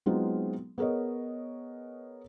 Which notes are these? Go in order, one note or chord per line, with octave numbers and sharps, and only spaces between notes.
F#3 G#3 B3 C4 D#4 F4
B3 G#4 A#4 C#5 D#5